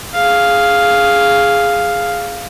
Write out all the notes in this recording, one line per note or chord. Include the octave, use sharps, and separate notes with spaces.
G#4 F5